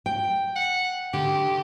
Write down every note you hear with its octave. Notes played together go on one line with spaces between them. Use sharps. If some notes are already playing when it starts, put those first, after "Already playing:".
G5
F#5
D3 G4